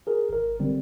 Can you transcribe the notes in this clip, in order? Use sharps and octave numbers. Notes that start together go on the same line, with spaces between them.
G#4 A#4
G#1 A#4
D3 G3 C4